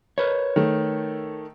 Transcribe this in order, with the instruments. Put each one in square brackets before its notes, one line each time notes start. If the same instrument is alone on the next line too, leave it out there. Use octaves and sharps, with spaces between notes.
[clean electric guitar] A#4 B4 C#5
[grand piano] D#3 A3